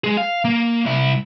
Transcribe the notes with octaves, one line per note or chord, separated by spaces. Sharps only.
G#3 G#4
F5
A#3
C2 E4